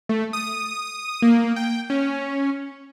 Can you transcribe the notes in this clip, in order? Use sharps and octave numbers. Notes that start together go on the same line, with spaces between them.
A3
D#6
A#3
G5
C#4